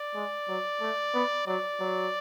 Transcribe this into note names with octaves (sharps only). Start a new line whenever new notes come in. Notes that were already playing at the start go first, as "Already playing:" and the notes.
Already playing: D5
G#3
F#3
A3
B3
F#3 D5
F#3